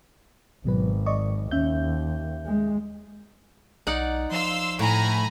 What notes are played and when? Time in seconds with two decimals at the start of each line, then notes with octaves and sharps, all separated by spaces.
0.65 G#1 B2 F#3 B4
1.06 D5 D#5 C#6
1.51 D#2 C#4 E5 G6
2.46 G#3
3.87 B1 D#4 D5 F#5
4.31 F3 F5 C6 E6
4.79 A2 G#5 A#5 B5